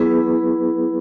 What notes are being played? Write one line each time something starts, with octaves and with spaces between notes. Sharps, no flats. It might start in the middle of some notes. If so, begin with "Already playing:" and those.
Already playing: F#3 B3 E4 G#4 B4